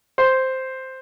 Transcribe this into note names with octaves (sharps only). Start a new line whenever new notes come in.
C5